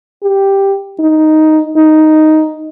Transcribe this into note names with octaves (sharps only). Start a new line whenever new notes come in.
G4
D#4
D#4